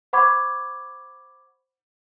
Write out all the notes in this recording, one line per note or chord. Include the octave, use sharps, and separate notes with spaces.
C5 F#5 B5 C#6 D6 G#6